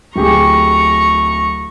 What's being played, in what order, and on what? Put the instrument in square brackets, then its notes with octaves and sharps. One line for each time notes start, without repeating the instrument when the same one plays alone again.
[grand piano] D1 G4 G#4 [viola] A#5 C#6